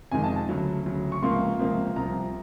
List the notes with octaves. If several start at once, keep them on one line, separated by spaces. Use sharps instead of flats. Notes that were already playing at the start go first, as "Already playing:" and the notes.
F2 C3 D#3 G#3 G#5
A5
A5
D2 C#3 F#3
D2 C#3 F#3
C#6
C#2 C3 F3 A#3 C6
C#2 C3 F3 A#3
C2 C3 F3 A#5